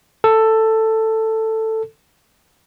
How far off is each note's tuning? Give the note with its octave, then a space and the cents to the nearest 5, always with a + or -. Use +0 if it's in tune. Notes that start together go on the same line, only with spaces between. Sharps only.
A4 +10